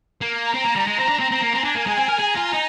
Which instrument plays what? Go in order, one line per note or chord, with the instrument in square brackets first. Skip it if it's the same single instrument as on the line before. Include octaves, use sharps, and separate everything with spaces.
[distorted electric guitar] A#3 [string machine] A#5
[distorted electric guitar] C4
A#3
G3
G#3
C4
D4
[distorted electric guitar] C4 [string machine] A#5
[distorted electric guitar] C4
A#3
[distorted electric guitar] C4 [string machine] G#5
[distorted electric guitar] D4
A#3
G#3
C4
A#4
[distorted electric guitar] G#4 [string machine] A#5
[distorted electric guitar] F4
D#4